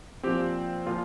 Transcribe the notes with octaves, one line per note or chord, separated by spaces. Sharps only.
A#2 F3 C4 G4
A#2 F3 F4